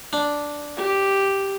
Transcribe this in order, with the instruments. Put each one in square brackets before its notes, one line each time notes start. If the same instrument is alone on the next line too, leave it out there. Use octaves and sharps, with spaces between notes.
[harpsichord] D4
[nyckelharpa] G4